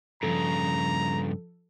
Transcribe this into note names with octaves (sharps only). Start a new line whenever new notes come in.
G2 C#3 F3 A4 A#5